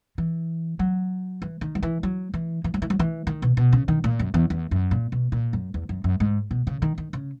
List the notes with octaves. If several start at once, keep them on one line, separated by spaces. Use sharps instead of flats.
E3
F#3
E3
D#3
F#3
E3
F#3
E3
E3
F#3
E3
F#3
E3
D#3
B2
B2
C#3
D#3
A#2
F#2
E2
E2
F#2
A#2
B2
A#2
F#2
E2
F#2
F#2
G#2
B2
C#3
D#3
D#3
C#3